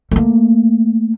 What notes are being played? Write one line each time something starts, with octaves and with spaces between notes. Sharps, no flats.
A3 A#3